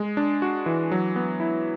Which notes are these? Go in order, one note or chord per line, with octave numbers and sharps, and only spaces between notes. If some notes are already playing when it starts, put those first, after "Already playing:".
Already playing: G#3
D4
F#4
E3
F#3
B3
E4